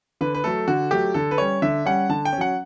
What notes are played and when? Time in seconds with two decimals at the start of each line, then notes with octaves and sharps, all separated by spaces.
0.21 D3 B4
0.34 B4
0.44 F#3 A3 A4
0.68 D3 F#4
0.91 F#3 A3 G4
1.14 D3 A4
1.31 B4
1.38 G3 C#4 C#5
1.62 D3 E5
1.85 G3 C#4 F#5
2.09 D3 A5
2.25 G5
2.33 C#4
2.38 F#3 F#5